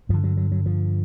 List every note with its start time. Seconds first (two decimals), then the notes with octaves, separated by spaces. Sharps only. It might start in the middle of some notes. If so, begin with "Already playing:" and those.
0.09 G2 D3 F3
0.24 F#3
0.37 F#3
0.52 F#3
0.66 F3